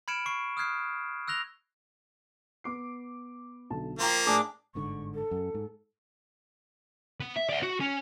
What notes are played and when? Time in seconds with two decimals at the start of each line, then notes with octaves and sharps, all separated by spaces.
0.08 B5 F6 G#6 C#7 D7 E7
0.26 C#6 C7
0.57 D#6 F6 F#6 G#6 C7
1.28 E6 F#6 A#6 F7 G7
2.64 B3 D6 C7
3.70 B1 D3 A5
3.99 F3 A#3 G5 A#5 C6
4.27 A2 D4 G#4 D6
4.75 G1 G#2 D3 C#6
5.14 A4
5.31 F#2
5.54 G#2
7.20 B3
7.36 E5
7.49 D5 E5
7.63 F#4
7.81 C#4